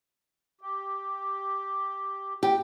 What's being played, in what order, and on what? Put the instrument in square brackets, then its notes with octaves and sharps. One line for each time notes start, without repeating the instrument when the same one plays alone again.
[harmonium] G4
[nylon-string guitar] G4